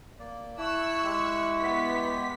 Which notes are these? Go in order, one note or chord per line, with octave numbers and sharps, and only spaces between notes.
A#3 D5
E4 A5 C#6 E6 F#6
G#3 G4
B3 B6